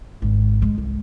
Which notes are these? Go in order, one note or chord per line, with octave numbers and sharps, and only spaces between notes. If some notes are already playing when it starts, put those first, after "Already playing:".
G#1
G#3
C2